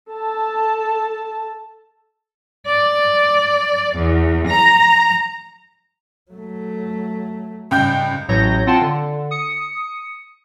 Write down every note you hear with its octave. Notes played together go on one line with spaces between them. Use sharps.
A4 A5
D5
E2
A#5
F#3 A3
C#2 G#2 G3 G5 G6
A1 A2 F#3 C#5 G6 A#6
C4 F4 F#5 G5 A5 C6
D3
D#6 C#7